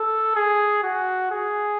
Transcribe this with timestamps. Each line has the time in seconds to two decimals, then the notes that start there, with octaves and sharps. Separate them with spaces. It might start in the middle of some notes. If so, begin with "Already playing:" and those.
Already playing: A4
0.36 G#4
0.83 F#4
1.31 G#4